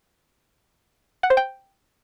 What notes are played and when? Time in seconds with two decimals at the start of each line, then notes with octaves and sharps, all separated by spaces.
1.23 F#5
1.30 C5
1.37 G5